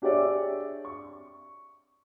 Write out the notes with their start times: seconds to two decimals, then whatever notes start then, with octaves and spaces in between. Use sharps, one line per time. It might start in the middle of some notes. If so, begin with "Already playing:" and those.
0.02 D4 G4 G#4 C#5 D5 E5
0.85 C#6